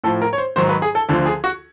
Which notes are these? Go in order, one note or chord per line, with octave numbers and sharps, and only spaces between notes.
A2 F3 A4
A#4
C#5
C5
G#2 D#3 F#3 C5
B4
G#4
A4
D2 D3 F3 A4
G#4
F#4